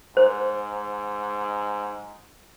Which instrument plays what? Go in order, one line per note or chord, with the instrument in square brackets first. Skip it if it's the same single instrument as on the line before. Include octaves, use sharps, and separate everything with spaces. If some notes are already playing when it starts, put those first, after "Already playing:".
[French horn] G#2 [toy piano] C5